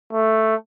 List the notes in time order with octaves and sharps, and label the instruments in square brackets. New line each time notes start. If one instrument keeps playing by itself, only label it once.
[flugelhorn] A3